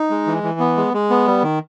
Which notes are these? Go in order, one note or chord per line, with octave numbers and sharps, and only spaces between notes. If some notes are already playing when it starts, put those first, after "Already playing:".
Already playing: D#4
G#3
E3
E3
B3
G#3
G#3
B3
G3
D#3